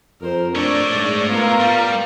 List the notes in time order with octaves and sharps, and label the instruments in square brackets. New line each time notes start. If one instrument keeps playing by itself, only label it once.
[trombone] F2 [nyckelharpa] A#4 C5
[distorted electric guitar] A3 C#5 [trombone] D4 [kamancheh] D5 [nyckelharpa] A5
[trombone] G#2
[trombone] B3 [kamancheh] F4 A#4 [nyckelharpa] F5 A#5
[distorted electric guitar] G3